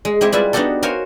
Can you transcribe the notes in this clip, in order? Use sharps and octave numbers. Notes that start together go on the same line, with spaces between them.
G#3
G#3 C4 E4 G4 E5
G3 E4 F4 B4 D5 E5
B3 D4 D#4 F#4 G4 A4
F#4 A#4 C5 C#5 F5 G#5